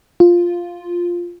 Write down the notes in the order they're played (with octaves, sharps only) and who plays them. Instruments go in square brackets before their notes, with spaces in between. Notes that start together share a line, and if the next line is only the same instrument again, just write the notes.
[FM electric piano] F4